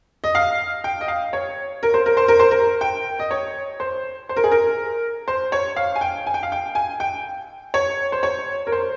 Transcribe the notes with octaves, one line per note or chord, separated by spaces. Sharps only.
D#5
F5
G5
D#5
F5
C#5
A#4
C5
A#4
C5
A#4
C5
A#4
G5
D#5
C#5
C5
C5
A#4
G#4
A#4
C5
C#5
F5
G#5
G5
G#5
G5
F5
G5
G#5
G5
C#5
C5
C#5
A#4
C5